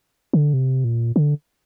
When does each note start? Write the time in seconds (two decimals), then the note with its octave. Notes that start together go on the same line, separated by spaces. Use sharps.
0.33 D3
0.54 C3
0.84 A#2
1.16 D3